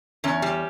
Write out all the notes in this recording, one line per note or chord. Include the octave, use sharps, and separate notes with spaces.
E2 C#4
G3